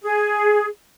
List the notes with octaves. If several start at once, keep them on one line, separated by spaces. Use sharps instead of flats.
G#4